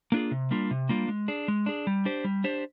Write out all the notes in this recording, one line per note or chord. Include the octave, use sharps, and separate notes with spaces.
A#3 D4 F4 G#4
C3
G3 A#3 D4 F4
C3
G3 A#3 D4 F4
G#3
D4 G#4
G#3
D4 G#4
G3
D4 G4 C5
G3
D4 G4 C5